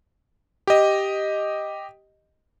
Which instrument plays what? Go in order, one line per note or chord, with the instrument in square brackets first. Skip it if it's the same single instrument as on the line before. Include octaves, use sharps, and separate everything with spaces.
[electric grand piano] G4 D#5